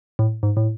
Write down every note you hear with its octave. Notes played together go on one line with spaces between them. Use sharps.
A2
G#2
A2